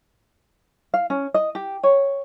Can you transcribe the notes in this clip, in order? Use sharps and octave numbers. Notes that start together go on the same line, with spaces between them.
F5
C#4
D#5
G4
C#5